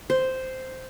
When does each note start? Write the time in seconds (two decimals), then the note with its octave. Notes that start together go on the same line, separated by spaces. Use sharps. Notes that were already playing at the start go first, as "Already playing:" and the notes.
0.10 C5